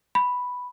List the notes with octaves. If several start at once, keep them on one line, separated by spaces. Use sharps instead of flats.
B5